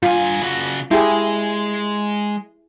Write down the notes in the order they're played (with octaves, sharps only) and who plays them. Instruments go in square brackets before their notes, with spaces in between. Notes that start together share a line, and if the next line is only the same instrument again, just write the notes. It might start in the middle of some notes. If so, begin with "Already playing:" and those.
[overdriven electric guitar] G2 G#5 [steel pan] F4
[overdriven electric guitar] C#3 F#4
[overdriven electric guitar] G#3 [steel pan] E4 G4 G#4